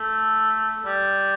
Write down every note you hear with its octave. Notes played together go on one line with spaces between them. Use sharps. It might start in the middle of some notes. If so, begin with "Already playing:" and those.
Already playing: A3
G3